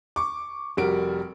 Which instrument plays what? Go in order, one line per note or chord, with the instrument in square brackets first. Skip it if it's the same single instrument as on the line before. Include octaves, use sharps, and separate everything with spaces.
[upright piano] C#6 D6
F1 G3 F#4 A#4 D7